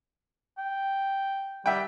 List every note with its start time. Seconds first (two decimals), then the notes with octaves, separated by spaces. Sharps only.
0.58 G5
1.66 G3 E5 F#5 G5